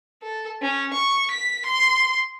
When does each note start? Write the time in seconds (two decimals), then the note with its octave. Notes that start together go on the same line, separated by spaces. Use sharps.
0.22 A4
0.62 C#4
0.94 C#6
1.31 B6
1.66 C6